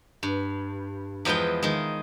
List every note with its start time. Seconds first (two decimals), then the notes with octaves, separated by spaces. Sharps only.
0.23 G2
1.25 E2 F3 G#3 B4 G5
1.63 D#3 G#3